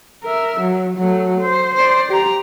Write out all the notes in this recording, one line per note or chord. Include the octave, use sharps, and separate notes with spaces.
A#4 E5
F#3
F#3 A3
C5
C5 D5
G4 A#5